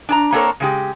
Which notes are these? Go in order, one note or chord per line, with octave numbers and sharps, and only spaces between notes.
D4 A5 A#5
A#3 C4 D4 A4 A#4 C#5
C#3 G#3 G4